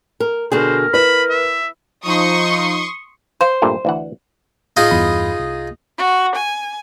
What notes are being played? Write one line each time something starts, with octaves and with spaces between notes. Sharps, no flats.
A#4
B2 D3 G#4 A#4 C5
E4 B4 B5
E5
F3 D#4 C6 C#6 D#6
C5 F5
G2 A#2 A3
D2 E3 F#5
A2 D#4 F4 G#4
E2 G2 B5
C2
F#4
G#5